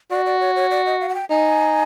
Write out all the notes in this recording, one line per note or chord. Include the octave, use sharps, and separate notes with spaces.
F#4 D5
D5
C#5
C#5
D5
D#5
F5
F#5
G5
D#4 G#5